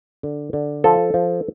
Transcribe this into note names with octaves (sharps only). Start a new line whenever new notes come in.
D3
D3
F3 A4
F3